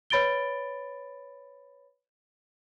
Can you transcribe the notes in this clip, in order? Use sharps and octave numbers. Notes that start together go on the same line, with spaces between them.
B4 C#5 B5 A6 D7 G7